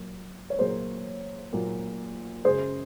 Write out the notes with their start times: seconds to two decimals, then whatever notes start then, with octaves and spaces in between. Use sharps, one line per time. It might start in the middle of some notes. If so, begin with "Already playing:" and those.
Already playing: A#2 F#3 A#3
0.50 C#5
0.59 A#2 F#3 A#3 G#4 C5
1.53 A#2 F#3 A#3
2.45 F#2 C#3 G#3 G#4 C5